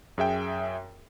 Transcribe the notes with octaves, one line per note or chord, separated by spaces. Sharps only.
F#2 G#4 E5 G5